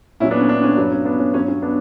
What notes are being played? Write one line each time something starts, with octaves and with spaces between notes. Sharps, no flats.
A#2 F#3 C#4 E4
B3 D4
C#4
B3 D4
C#4
G2 F#3 B3
C#4
B3 D4
C#4
G2 F#3 C#4
C#4
B3 D4